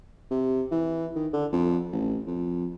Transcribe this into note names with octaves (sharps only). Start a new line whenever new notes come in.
C3
E3
D#3
D3
F2
A1
F2